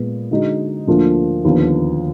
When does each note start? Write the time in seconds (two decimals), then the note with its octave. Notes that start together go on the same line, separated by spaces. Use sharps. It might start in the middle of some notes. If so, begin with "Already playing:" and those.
Already playing: A#2 G#3 B3
0.31 D3 G#3 D#4 F#4
0.87 D2 D3 F3 A#3 F4
1.45 D#2 D3 F3 B3